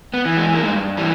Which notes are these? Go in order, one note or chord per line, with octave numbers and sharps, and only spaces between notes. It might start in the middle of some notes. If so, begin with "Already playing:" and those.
B3
E3
G#3
A#3
G2 G#3
E3 G3